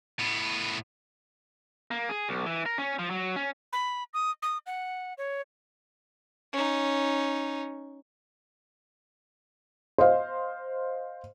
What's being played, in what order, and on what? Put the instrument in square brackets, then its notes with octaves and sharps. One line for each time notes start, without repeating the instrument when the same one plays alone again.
[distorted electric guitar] A2 B3
[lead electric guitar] A#3
G#4
B1
E3
A#4
C#4
F3
F#3
C#4
[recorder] B5
D#6
D#6
F#5
C#5
[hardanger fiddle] C#4 D#4
[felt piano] C5 D#5 F5